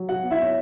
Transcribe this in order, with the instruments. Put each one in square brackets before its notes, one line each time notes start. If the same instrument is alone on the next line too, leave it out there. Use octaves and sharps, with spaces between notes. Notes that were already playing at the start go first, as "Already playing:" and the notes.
Already playing: [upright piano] F#3
F#4 F#5
B3
E4 E5
C#5